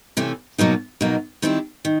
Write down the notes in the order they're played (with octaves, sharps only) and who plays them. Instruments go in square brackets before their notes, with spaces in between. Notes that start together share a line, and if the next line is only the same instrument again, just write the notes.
[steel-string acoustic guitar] C3 E3 A3 C#4
B2 F#3 A#3 D#4
B2 F#3 A#3 D#4
D#3 G3 C4 E4 G4
D#3